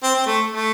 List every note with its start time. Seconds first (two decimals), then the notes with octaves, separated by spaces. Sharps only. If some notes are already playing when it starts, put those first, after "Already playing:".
0.03 C4
0.15 C4
0.26 A3
0.50 A3